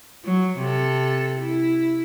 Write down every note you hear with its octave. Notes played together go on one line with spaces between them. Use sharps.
F#3
C3 A4
E4